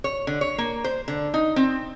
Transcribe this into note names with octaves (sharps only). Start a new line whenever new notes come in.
C#5
D3
C#5
A#3
C5
D3
D#4
C4